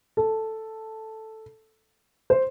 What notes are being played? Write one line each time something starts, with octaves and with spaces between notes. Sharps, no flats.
A4
C5